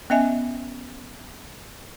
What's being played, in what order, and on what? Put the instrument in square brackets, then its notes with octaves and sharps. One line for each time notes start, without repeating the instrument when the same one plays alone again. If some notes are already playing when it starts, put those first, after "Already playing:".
[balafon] B3 C#4 D#5 E5 G#5